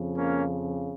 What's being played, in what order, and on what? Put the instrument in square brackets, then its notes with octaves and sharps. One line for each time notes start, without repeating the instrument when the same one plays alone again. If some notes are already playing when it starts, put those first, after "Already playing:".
Already playing: [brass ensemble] F2 C#3 F3
A#3 C#4